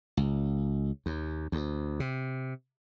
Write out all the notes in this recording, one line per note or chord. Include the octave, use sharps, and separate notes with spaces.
C#2
D#2
D2
C3